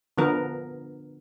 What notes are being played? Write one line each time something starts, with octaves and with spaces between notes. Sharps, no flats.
D3 F3 B3 A#4